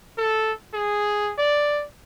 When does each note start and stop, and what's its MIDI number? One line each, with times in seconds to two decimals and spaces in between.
0.18 0.52 69
0.74 1.32 68
1.38 1.85 74